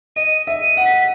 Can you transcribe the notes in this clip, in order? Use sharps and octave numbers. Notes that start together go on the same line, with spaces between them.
D#5 D#7
E5
D#7
F#5
B6